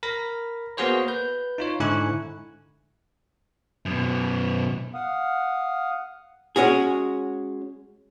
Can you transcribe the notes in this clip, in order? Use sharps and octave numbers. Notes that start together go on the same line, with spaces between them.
A#4 B5 A#6
A#3 B3 F#4 G#4 C5 C#5
B4 G6
D#4 F4 C#5
G#2 D3 E4 G#5 C#6 F#6
F#2 B2
F5 F#5 D#6
G#3 C#4 F#4 G#4